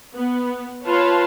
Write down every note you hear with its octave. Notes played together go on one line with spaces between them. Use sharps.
B3
F4 B4 C#5 F5 A5 C6